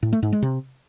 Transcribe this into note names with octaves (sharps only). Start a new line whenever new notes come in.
A2
A3
G#2
G#3
C3